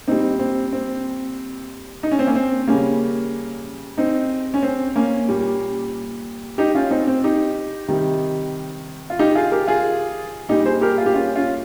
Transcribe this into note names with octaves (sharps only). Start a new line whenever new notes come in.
A#2 G3 C4 D#4
C4
C4
D#4
C#4
C4
A#3 C#4
C4
C#3 G3 A#3 C#4
C4 D#4
C#4
C4
A#3 C#4
A#2 G3
D#4 G4
C#4 F4
C4 D#4
C4
D#4 G4
C3 D#3 G3
F4
D#4 G4
F4 G#4
G4 A#4
F4 G#4
A#2 G3 D#4 G4
G#4 C5
G4 A#4
F4 G#4
G4
C#4 F4
C#4 F4